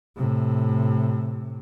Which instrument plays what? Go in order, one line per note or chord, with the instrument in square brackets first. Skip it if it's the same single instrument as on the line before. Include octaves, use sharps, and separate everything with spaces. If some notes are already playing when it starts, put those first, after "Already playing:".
[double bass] A2 C3